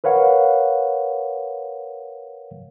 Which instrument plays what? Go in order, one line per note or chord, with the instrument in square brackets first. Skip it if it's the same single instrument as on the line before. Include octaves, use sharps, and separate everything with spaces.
[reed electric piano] A#4 B4 C#5 F5 F#5